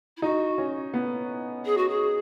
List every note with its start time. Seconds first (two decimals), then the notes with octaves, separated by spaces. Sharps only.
0.17 E4
0.22 D#4 F#4
0.58 C#4
0.94 B3
1.65 G#4
1.77 F#4
1.89 G#4